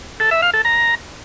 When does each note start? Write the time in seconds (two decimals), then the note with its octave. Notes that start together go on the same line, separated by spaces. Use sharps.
0.20 A4
0.31 E5
0.42 F5
0.54 A4
0.65 A#5